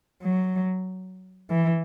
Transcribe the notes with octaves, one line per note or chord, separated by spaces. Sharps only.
F#3
E3